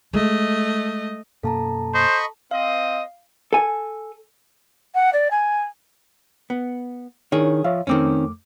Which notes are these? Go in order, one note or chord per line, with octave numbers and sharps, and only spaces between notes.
G#3 A3 D#5
F#2 B2 A#3 A4 A5 A#5
C5 D#5 B5 C#6
C4 D#5 F5
A4 G#5
F#5
D5
G#5
B3
D#3 D4 E4 G#4 C#5
F3 C#5 E5 F5
F2 D#3 A3 C4 C#4 D6